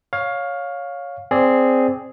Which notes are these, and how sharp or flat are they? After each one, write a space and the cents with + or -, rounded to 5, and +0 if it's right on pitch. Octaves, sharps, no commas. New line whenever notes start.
C#5 +5 F5 +15
C4 -5 G#4 +0 D5 +0